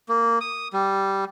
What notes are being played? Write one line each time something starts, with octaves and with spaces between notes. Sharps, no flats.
A#3
D#6
G3